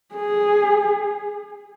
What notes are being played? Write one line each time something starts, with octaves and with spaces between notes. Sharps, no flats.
G#4